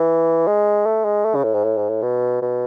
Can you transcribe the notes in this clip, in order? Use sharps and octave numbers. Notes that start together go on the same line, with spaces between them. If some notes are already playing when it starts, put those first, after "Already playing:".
Already playing: E3
G#3
A3
G#3
A3
C#3
A2
G#2
A2
G#2
A2
B2
B2